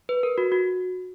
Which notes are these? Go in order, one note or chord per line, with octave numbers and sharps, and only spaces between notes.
B4
A#4
F#4
F#4